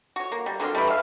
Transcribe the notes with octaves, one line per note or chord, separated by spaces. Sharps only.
F#4 C#5
A#3
G3
D3 F#3 C4 F4
G3 A3 E4 B4
E5 F5